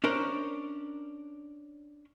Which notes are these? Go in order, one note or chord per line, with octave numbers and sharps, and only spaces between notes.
C#4 D4 A#4 C5